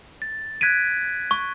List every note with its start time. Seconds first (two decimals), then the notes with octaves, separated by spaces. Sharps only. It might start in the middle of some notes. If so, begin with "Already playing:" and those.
0.22 A6
0.61 F#6 G#6 B6 D7 D#7
1.31 C#6